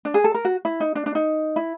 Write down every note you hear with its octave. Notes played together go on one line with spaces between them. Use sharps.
D4
G#4
A4
A#4
F#4
E4
D#4
D4
D4
D#4
E4